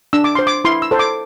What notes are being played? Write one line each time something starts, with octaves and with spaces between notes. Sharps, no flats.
D4 E6
D6
C5 C6
D6
E4 C6
E6
A4 C5
D6